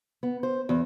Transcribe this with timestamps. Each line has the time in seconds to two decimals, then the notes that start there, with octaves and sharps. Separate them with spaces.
0.23 B3
0.43 C5
0.69 E2